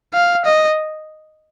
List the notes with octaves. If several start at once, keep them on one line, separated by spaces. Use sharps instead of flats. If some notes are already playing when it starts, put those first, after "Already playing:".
F5
D#5